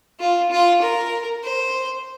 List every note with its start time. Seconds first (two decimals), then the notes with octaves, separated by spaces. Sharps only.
0.20 F4
0.51 F4
0.82 A#4
1.44 C5